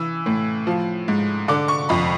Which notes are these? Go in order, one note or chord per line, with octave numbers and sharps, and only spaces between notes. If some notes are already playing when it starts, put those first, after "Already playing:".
Already playing: E3 E6
A2
F3
G#2
D3 D6
C#6
F2 B5